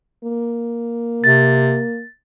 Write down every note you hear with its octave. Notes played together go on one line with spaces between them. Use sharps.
A#3
C3 A6